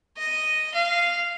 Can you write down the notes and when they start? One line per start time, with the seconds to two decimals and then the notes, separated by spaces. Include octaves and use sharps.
0.17 D#5
0.74 F5